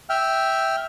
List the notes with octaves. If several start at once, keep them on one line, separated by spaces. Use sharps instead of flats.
E5 G5 F6